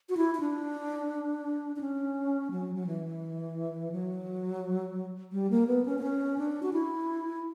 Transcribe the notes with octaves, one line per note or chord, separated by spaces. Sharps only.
F#4
E4
E4
D4
D4
C#4
F#3
F#3
E3
F#3
G3
A#3
B3
C#4
B3
C#4
D4
F#4
E4